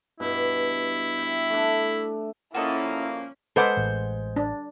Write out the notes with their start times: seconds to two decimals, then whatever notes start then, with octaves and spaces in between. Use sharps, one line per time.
0.20 G2 B2 E4
1.18 E5 G5
1.50 A3 D4
2.54 A#2 F3 A#3 C#4 E4 F#4 A4 D#5
3.56 G#3 A4 B4 C5 F#5 D6
3.77 A1 A2 E3
4.36 D4